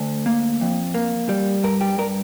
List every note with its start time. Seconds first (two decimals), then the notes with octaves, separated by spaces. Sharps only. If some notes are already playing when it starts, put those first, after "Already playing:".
Already playing: D2
0.26 A#3
0.61 F2
0.94 A#3
1.29 G3
1.64 G2 A#4
1.81 G4
1.98 G2 A#4